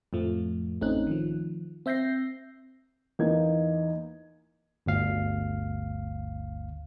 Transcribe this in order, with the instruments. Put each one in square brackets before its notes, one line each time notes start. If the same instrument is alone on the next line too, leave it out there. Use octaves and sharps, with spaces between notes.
[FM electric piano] F2 A2 F3 A3
A1 A3 C4 C#4 D#4 F#6
D#3 F3
C4 E5 G6 A#6 C7
[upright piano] E2 A#3 D#4 G#6
[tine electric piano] G1 D2 F5